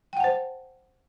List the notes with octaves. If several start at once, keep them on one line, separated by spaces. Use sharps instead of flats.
C5 F#5 G5 A5